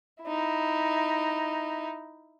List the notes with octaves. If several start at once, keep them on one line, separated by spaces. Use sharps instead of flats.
D#4 E4